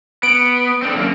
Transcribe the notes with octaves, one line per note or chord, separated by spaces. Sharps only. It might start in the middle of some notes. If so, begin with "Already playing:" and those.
B3 D7
C4 D4 A4
F#2 A#3